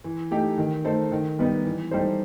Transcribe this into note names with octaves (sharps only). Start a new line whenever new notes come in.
E3
A3 D#4 G4
D#3
A3 D#4 A4 C5
D#3
G3 B3 D#4
E3
G3 D#4 A4 C5